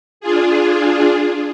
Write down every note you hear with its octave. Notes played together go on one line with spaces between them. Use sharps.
D4 F4 G#4